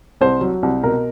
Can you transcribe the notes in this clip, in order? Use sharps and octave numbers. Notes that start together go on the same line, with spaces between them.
C2 C5
F#3
C2
B2 A#4